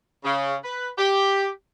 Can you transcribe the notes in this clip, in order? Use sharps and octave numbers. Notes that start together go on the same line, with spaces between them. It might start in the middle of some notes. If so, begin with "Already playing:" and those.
C#3
B4
G4